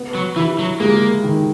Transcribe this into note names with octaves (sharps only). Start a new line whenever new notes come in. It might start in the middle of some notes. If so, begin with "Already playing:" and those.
Already playing: B3
F#3
E3 E4
F#3
G#3 A#3
D#3